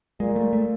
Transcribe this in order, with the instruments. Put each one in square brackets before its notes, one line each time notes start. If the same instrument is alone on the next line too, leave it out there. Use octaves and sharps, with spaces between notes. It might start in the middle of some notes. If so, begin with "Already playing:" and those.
[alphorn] A#2 [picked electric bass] G#3
[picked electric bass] A3
A3